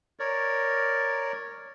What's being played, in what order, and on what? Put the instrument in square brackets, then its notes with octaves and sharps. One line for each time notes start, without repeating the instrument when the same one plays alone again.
[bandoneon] A#4 C#5 D5